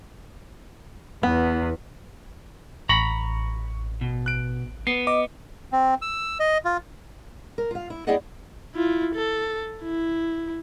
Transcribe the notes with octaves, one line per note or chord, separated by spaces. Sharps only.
E2 B3
A1 A#5 B5 C#6 C#7
B2
F#6 D7
B3 C7
D#5 D6
C4
E6
D#5
F4
A#4
F4 F5
E4
C4 E4 G#4 D5 D#5 F#5
E4 F4
A4
E4